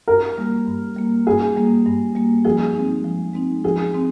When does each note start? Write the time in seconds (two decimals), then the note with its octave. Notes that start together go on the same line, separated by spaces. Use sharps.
0.08 G2 A#4
0.37 G3 A#3
0.67 G2
0.97 G3 A#3
1.27 G2 G#4
1.57 G3 A#3
1.86 G2
2.15 G3 A#3
2.45 F3 G#4
2.75 G#3 C4 D#4
3.04 F3
3.34 G#3 C4 D#4
3.65 F3 G#4
3.94 G#3 C4 D#4